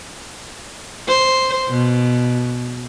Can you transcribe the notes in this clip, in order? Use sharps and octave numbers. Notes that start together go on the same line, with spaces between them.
C5
B2